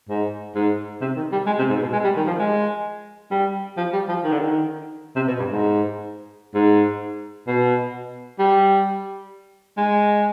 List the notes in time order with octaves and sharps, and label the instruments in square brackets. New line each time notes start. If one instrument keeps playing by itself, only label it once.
[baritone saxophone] G#2
G#2
C3
D#3
G3
G#3
C3
G#2
B2
G#3
G3
D#3
F3
G#3
G3
F3
G3
F3
D#3
D3
D#3
C3
B2
G2
G#2
G#2
B2
G3
G#3